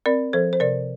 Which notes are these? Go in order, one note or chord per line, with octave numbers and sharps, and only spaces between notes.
C4 A#4 D5
F3 A4 C5
C5
C3 A#4 D5